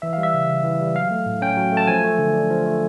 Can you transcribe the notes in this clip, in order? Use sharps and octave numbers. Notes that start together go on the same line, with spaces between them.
E3 E5
G3 F5
E5
C#3
C#3
E3
G3
F#3 F5
A3
A2
C#4 G5
F#3
A3 A5
F3 G#5
A3
D3
D4
F3
A3